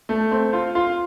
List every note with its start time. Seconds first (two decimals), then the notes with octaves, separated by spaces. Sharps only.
0.09 A3
0.31 C4
0.53 F4
0.75 F4